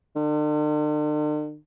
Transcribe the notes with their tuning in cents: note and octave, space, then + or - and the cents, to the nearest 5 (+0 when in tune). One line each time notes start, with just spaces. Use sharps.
D3 +45